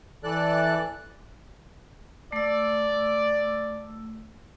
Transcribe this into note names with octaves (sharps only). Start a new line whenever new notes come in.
E3 A4 D5 F#6
A3 D5 E6